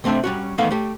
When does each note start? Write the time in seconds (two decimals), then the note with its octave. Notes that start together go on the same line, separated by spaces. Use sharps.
0.04 C3 A3 C4 D4 E5
0.24 G3 C#4 F#4
0.58 E2 D#3 A3 B3 F5
0.71 A3 G4